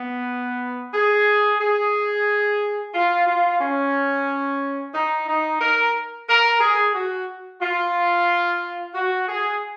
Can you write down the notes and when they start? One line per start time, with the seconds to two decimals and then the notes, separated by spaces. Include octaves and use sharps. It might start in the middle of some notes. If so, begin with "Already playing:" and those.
Already playing: B3
0.93 G#4
1.60 G#4
2.94 F4
3.27 F4
3.60 C#4
4.94 D#4
5.27 D#4
5.61 A#4
6.28 A#4
6.61 G#4
6.94 F#4
7.61 F4
8.95 F#4
9.28 G#4